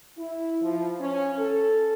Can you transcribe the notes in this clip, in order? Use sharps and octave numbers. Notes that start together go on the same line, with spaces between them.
E4
F3
C#4
A4